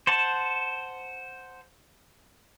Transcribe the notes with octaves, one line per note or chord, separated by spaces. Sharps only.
C5 F#5 A5